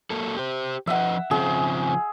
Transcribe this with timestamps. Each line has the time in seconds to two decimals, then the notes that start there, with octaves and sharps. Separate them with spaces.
0.10 F#3 A#3 A4
0.37 G4 C5
0.87 F3 B4 D#5 E5 F#5
1.31 C#3 F3 C4 G#4